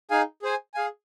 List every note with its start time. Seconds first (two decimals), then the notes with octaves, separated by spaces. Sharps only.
0.10 D#4 G#4 F5 G#5
0.42 G#4 C5 G#5
0.74 G#4 F5 G#5